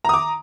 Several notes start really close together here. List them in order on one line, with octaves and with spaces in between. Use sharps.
A#5 D#6 D6